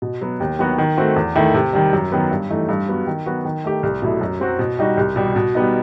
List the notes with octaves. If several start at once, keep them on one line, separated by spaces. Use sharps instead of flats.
B2
F#3 B3
D#2
D#3 F#3 B3 F#4
D#3
A3 C4 F#4
E2
D#3 A3 E4
C3
D#3 G3
F#2
D#3 F#3 B3
G2
E3 A3 D#4
G2
F#3 B3 F#4
D#3
F#3 B3 F#4
D#3
A3 D#4 G4
C2
B2 F#3 A3 E4
F#2
F#3 C4 F#4
B2
G3 D#4 F#4
C2
B2 G3
B2
G3 B3 D#4